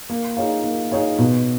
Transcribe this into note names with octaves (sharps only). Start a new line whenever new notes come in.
A#3
D#4 G#4 C#5 F5
A#3
D#4 G#4 C#5 F5
B2